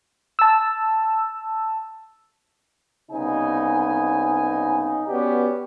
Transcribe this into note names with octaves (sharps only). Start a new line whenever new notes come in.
A5 E6
C2 C#3 B3 D#4 G#5
B3 C#4 F#4 G4 B4 D5